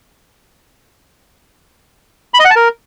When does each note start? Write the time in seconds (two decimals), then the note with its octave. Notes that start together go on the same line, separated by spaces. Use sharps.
2.34 B5
2.39 D#5
2.45 F#5
2.50 A5
2.56 A#4